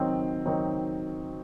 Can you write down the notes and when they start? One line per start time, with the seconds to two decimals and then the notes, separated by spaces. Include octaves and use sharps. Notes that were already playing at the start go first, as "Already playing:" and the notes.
Already playing: D#3 F#3 C4 D#4
0.45 D#3 F#3 C4 D#4